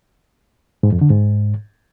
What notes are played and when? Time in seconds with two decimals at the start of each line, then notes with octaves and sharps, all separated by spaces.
0.83 G#2
0.92 F2
1.01 D3
1.10 G#2